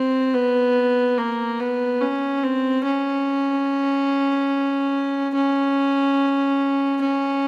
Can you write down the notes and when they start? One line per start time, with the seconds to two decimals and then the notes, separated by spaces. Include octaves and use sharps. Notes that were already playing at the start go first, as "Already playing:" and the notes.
Already playing: C4
0.34 B3
1.18 A#3
1.60 B3
2.01 C#4
2.43 C4
2.84 C#4
5.34 C#4
7.01 C#4